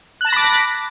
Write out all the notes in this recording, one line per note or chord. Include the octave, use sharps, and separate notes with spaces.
A5 B5 D6 F#6 A#6